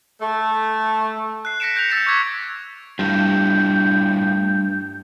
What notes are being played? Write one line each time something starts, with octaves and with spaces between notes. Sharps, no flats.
A3
F#6 C7
F#6 A#6 B6 C#7 D7 E7
G6 A#6 C#7 F7
E6 A6 C#7 E7
C#6 D6 E6 G#6 B6
G2 A3 E4 F4 G6